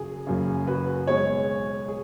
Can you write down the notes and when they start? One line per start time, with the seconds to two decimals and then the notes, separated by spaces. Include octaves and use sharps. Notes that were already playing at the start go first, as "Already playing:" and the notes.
Already playing: F#2 C#3 F#3 G#4
0.27 F#1 F#2 C#3
0.67 F#4 B4
1.07 B1 B2 G#3 G#4 C#5
1.88 G#4